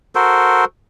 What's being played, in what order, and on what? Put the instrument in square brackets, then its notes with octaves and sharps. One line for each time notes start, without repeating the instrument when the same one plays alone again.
[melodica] F#4 A4 A#4 C5